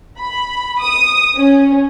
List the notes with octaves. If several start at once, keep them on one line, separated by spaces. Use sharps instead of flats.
B5
D#6
C#4